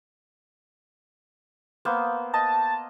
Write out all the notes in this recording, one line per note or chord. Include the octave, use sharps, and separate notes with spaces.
A#3 B3 C5
D#5 A5